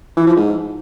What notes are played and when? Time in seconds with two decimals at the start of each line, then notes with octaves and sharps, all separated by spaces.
0.17 E3
0.27 F3
0.37 G#2